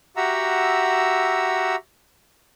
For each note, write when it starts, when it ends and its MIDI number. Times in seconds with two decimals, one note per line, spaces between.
0.17 1.76 66
0.17 1.76 67
0.17 1.76 76
0.17 1.76 78
0.17 1.76 82
0.17 1.76 88